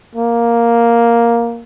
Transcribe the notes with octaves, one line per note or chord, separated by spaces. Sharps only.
A#3